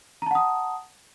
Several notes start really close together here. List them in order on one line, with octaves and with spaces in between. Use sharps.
A#5 A5 F#5 D#6